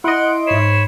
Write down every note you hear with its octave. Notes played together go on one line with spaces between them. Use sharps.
E4 D#5 F#5 C6 D7
G#2 C#5 B5 C7 E7